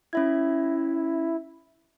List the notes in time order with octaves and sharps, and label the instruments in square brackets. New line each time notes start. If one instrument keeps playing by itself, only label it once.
[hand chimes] C#4 E5 G#6 [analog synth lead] E4